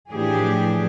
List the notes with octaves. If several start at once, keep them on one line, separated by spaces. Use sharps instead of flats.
A2 E3 F3 D4 G4 G#4